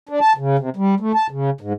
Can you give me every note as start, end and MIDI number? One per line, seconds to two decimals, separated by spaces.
0.09 0.20 62
0.21 0.33 81
0.38 0.57 49
0.59 0.70 48
0.77 0.95 55
1.00 1.12 57
1.15 1.27 81
1.31 1.50 49
1.61 1.73 44